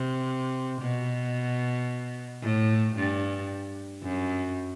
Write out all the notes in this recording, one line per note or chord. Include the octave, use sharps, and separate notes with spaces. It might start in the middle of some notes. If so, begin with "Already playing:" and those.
Already playing: C3
B2
A2
G2
F#2